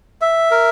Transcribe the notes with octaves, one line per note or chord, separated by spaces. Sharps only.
E5
A#4